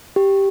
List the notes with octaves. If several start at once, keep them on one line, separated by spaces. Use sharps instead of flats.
G4